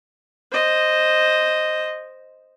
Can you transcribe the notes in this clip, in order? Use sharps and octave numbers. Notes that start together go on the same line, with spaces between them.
C5 D#5